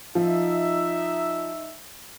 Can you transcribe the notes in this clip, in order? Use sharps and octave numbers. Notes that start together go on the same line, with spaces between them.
F3 D#4 E5